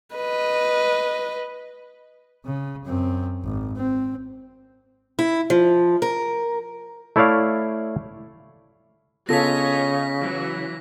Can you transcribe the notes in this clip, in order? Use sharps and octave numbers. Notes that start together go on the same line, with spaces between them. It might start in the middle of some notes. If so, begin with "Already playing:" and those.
B4 D#5
C#3
F#2 C4
G#1
C4
E4
F3
A#4
A3 E4 C#5 D5 F5
C#3 B3 F4 A4 C#5 D#5 A#6 B6
E3 F#3